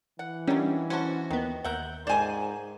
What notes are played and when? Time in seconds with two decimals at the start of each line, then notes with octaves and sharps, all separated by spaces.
0.19 E3 F#5
0.47 D#3 F#3 G3 C#4 D4
0.90 C#4 E4 F#4 C5 F#5 A5
1.30 D#2 D#3 B3
1.64 D#2 A#4 E5 F#5 G6
2.07 G#2 D#3 F4 C5 D5 G#5